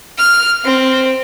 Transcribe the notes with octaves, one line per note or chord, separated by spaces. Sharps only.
F6
C4